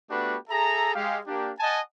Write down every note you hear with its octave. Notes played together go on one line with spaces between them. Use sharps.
A3 B3 D4 F#4 G4 B4
G#4 A4 E5 A#5
G#3 G4 F5
A#3 D4 G4
D#5 F#5 G#5 A5